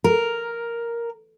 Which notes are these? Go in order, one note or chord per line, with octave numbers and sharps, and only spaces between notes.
A#4